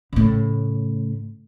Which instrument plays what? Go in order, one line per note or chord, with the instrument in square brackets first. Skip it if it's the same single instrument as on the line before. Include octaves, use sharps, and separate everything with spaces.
[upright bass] A2 C#3